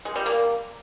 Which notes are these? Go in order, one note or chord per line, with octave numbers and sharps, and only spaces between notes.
G#3
G3
A#3